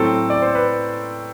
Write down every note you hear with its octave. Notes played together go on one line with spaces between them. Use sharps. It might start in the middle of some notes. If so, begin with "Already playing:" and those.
Already playing: A2 F#3 C4 A4
D5
C5
B4